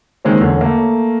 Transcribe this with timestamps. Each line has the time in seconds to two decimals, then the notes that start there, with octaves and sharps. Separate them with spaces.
0.25 D#3 G#3 A#3 C4 C#4
0.40 E2 D3 C#4
0.61 A3 A#3